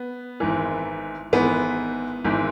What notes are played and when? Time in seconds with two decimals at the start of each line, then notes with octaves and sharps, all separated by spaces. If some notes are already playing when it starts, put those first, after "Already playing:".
Already playing: B3
0.40 G#1 G#2 E3
1.32 G#1 G#2 E3 B3
2.24 G#1 G#2 E3